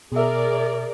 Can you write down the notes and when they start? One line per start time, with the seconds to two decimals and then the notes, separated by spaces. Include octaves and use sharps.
0.12 B2 G#4 A#4 D5 E5